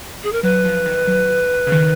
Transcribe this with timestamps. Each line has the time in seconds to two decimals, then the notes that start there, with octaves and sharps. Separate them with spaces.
0.23 G#4
0.32 A#4
0.43 F#3 B4
0.64 F3
0.86 D#3
1.07 F#3
1.67 C#3
1.72 D#3